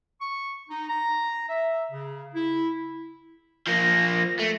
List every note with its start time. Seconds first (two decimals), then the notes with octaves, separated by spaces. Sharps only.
0.21 C#6
0.70 D#4
0.89 A#5
1.49 E5
1.91 C#3
2.34 E4
3.67 F3 A#3 A#6
4.39 A3